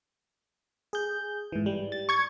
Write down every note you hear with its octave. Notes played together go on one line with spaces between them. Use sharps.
G#4 G6
G#2 E3
G3
A6
C#6 G#6